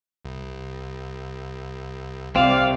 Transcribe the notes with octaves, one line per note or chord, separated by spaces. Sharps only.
C2
C2 C3 C4 D5 F5